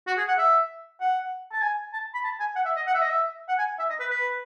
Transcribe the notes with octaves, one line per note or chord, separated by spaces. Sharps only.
F#4
G#4
F#5
E5
F#5
A5
G#5
A5
B5
A5
G#5
F#5
E5
D#5
F#5
E5
D#5
E5
F#5
G#5
E5
D#5
B4
B4